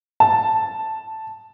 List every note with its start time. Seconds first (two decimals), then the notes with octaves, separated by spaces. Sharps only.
0.20 A5